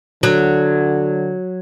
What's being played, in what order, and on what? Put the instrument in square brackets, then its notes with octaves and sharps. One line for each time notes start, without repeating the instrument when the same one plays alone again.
[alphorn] D3 [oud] F#3